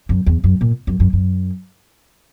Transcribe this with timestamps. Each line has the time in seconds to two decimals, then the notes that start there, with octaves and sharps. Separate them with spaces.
0.09 F#2
0.26 E2
0.44 F#2
0.61 A#2
0.87 F#2
1.00 F#2
1.13 F#2